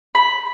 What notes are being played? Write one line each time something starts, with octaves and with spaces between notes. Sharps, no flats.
B5